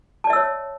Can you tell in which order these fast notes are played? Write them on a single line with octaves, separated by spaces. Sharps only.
A5 D5 E5 E6 C#5